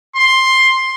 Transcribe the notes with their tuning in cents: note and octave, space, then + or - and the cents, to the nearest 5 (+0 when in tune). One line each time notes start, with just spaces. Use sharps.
C6 +10